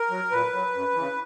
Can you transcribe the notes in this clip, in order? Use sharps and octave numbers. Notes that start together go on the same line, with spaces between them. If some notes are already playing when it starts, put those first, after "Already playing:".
Already playing: A#4
F#3
A#2 B4
F#3
F#2
C#3 E3